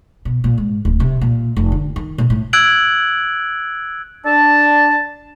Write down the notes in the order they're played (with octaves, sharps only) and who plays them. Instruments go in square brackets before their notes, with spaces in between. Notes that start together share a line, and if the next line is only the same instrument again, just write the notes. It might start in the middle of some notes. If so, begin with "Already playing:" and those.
[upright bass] B2
A#2
G#2
D1
C3
A#2
F1
D3
D#3
A#2
A2
[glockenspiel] E6 F#6 G#6 D7 F#7
[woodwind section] D4 A5